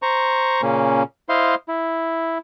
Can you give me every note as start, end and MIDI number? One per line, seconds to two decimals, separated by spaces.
0.02 0.61 72
0.02 0.61 82
0.02 0.61 85
0.62 1.03 46
0.62 1.03 49
0.62 1.03 58
0.62 1.03 61
1.29 1.55 64
1.29 1.55 72
1.29 1.55 75
1.29 1.55 77
1.29 1.55 84
1.68 2.38 64